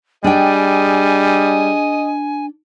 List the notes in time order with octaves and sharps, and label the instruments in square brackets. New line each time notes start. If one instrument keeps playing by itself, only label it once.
[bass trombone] G3 [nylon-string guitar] D4 G5 [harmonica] G#4 D#5 [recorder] G#5